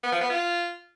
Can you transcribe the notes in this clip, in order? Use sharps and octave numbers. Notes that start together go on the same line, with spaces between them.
B3
F3
B3
F4